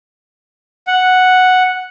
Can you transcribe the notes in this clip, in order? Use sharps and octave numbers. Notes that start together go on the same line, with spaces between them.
F#5